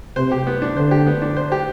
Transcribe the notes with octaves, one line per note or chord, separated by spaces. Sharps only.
C3 C5
G4
B3
D4
D3 C5
G4
B3
D4
C5
G4